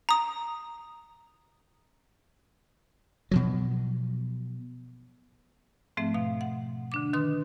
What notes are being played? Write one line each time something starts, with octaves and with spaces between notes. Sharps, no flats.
A#5 D#6
B2 F3 F#3
G#2 F3 A3 C4 E5
B2 F5
F#5
D3 D4 D6
D#3 B4 C6 D#6 F#6